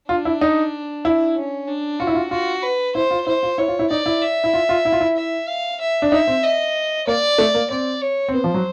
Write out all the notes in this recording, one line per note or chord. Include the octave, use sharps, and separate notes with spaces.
D4 F4
E4
D#4
E4
C#4
D4
F4 F#4
E4
F4
F4 F#4
B4
E4 C5
F4
E4 C5
F4
E4 C#5
F4
E4
D#4 D5
E4
E5
E4
F4
F4
E4
F4
E4
E5
F5
E5
D4
D#4 E5
C4
D#5
A#3 D5
A3
A#3
C4 D5
C#5
C4
B3 C5
F3
F#3